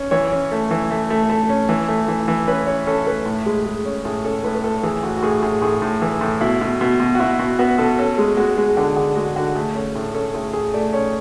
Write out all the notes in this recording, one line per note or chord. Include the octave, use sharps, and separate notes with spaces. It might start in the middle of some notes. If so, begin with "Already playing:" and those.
Already playing: C#4
E3 C#5
C#4
A3
E3
A3
A3
A3
C#4
E3
A3
E3
E3
C#4 B4
C#4 C#5
C#4 A4
A3 B4
A2
G#3
G#3
C#4
A2 G#4
C#4 A4
A2 B4
B4
A2 A4
E3 G#4
A2 F#4
F#4
A2 G#4
A2 G#4
A2 G#4
A2
E3
A2
B2 E4
B2
B2
B2
F#4
B2 E4
B2 F#4
B3 F#4
B2 A4
C#4 A4
G#3
G#3 F#4
G#3 G#4
D3
D3 G#4
G#3 F#4
D3 F#4
A3 G#4
C#4 A4
A2
C#4 A4
A2 G#4
A2 G#4
A3 D5
C#4 C#5